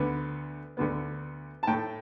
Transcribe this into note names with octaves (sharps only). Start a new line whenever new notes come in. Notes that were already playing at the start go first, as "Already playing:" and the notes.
Already playing: D2 D3 B3
D2 D3 B3
A5
A2 A3 G5